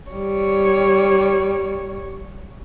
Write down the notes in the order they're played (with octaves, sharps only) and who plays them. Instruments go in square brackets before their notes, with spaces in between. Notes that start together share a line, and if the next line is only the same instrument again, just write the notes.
[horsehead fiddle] G3 C#5